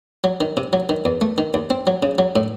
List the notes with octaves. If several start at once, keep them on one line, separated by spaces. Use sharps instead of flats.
F#3
D#3
C3
F#3
D#3
E2
A3
D#3
D#2
C4
F#3
C#3
F#3
A2